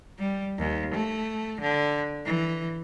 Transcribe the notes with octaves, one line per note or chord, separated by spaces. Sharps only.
G3
D#2
A3
D3
E3